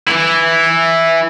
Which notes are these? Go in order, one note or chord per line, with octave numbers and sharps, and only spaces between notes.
E3 E4